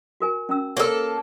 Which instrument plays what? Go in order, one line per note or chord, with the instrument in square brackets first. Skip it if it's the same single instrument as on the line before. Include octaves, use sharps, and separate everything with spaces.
[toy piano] F#4 A#4 G#5
C#4 A#5 E6
[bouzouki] A#3 A4 [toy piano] C#5 E6